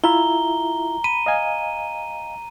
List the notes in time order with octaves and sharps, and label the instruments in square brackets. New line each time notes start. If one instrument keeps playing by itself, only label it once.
[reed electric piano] E4 F4 E5 [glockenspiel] A#5 G7
[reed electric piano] B5 [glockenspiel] D#7
[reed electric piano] D#5 F5 G#5